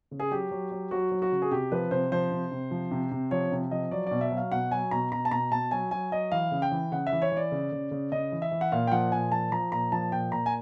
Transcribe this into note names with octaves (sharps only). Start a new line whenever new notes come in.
C#3
G#4
F#3 G4
F#3
F#3
F#3 F#4
F#3
F#4
C#3
G#4
C3 G4
F3 B4
C3 C5
F3 C5
C3
C3
F3
C3
C3
F3 C#5
C3
F3 D#5
F#3 D5
B2 D5
E5
F#3
F5
B2 F#5
F#3 G#5
B2 A#5
B2 A#5
A5
B2 A#5
B2 A5
F#3 G#5
F#3 G#5
F#3 D#5
E3 F5
C#3
G5
E3
C#3 F#5
E5
E3
C#5
E3
D5
C#3
C#3
C#3
C#3 D#5
E3
E5
E3
F#5
A#2 F5
G5
F3 F#5
A#2 G#5
F3 A5
F3 A#5
A#2 A#5
F3 A5
A#2 G5
A#2 A#5
G#5